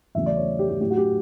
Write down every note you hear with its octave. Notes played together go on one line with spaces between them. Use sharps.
E2 C#3 F#3 A3 E5
D5
C#5
G4
G4
A2 F#3 A3 G4
F#4
G4